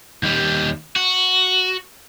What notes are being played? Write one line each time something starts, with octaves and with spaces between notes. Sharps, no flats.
D#2 G3
F#4